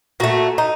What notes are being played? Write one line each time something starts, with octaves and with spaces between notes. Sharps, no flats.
A#2 A3 F#4
D#4